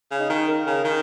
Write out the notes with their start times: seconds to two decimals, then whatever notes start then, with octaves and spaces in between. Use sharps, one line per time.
0.11 C#3
0.20 D#4
0.30 D#3
0.48 A#4
0.66 C#3
0.84 D#3